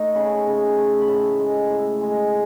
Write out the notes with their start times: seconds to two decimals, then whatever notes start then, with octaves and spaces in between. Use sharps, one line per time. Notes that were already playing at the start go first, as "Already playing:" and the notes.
Already playing: A3 D#4
0.15 C#3 B5
0.47 C#3
0.78 A3
1.01 B5
1.08 A2 A5
1.39 G#3
1.70 A2
2.01 G#3